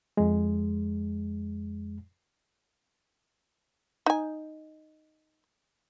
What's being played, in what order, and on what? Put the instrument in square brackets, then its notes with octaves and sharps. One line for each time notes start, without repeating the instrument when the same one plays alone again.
[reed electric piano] F2 G#3
[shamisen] D#4 G#5